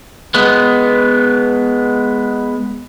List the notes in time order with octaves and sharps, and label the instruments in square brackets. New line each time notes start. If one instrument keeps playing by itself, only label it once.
[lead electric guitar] G#3 B3